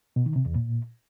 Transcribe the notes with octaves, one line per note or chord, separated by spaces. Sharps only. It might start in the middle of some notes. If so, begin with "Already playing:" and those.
B2
D#3
C3
E2
A#2